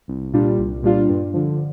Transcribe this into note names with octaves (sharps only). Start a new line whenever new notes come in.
C2
A#2 G3 D4 F4
C2
A#2 G3 D4 F4
G2
D3 F3